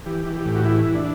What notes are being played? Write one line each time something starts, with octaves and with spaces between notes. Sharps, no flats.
E3 G4
E3
G4
A2
F#4
E3 E4
E3
D4